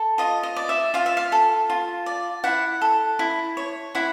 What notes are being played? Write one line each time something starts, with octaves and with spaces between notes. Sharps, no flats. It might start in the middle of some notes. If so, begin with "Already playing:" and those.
Already playing: A4
F4 D#5
D#5
D5
E5
F4 F5
E5
F5
A4
F4
D5
E4 F#5
A4
E4
C#5
E4 F#5